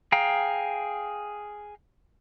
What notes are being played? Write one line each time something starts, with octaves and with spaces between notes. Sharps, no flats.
G#4 F5 G5 A#5